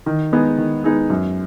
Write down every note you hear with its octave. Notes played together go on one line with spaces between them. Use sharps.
D#3
G#3 B3 D#4 G#4
D#3
G#3 B3 D#4 G#4
F#2